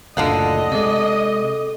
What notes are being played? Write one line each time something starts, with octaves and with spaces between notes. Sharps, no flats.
F#1 D2 A#2 D3 A4 D#5 F5 F#5
C3 G#3 A4 D6